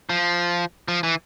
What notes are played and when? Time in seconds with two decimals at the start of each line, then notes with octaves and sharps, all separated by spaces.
0.10 F3
0.88 F3
1.03 E3